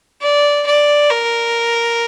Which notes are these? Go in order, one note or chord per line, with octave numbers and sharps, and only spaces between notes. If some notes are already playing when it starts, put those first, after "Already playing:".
D5
D5
A#4